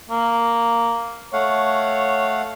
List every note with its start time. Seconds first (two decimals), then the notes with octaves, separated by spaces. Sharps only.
0.10 A#3
1.33 A3 C#5 F5 F#5